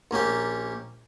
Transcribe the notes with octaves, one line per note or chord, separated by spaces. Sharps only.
A#1 A#3 C#4 G4